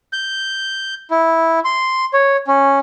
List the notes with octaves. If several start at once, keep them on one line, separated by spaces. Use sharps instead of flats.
G6
E4
C6
C#5
C#4